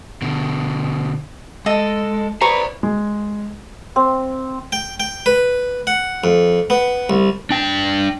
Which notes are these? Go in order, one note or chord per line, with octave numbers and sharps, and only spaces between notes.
B2 D3
G#3 A4 D#5
B4 C5 D5 A#5 C#6
G#3
C4
G5
G5
B4
F#5
F2
B3
C2
D4 G5